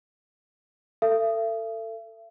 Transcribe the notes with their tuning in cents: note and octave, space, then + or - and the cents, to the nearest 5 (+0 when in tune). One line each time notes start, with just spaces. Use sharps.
A4 +25 E5 +40